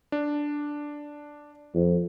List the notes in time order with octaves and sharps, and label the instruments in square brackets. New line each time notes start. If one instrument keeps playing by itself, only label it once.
[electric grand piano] D4
[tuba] F2